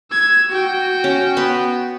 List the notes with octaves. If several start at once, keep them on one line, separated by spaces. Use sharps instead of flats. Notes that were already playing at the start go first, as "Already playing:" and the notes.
E6 G#6
F#4 G5
C#4
B3 B4 C6